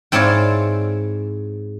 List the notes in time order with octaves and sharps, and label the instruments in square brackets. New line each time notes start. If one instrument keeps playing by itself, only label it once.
[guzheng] G#2 C4 E4 C#5 D5 F5